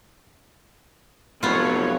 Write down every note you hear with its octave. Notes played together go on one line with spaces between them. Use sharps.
F1 F3 F#3 B3 F4 C#5